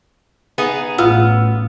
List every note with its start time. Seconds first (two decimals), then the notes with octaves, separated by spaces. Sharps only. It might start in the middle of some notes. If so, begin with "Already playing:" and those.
0.58 B3 D#4 G#4
0.98 A1 B3 F4 E6 F6